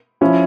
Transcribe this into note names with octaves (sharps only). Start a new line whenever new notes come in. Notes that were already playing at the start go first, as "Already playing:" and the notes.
F3 C#4 E4